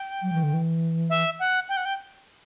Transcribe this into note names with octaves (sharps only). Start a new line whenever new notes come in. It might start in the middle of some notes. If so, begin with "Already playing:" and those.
Already playing: G5
F#3
E3
D3
E3
E5
F#5
G5
F#5
G5